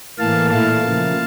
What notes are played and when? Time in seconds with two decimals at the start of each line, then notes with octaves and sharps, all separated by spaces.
0.19 A2 E3 A#3 F5 A5
0.50 A#2 A3 E4 F5 A5
0.81 C#3 F3 A#3